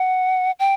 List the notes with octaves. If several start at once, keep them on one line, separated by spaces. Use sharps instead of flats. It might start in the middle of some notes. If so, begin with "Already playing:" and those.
Already playing: F#5
G5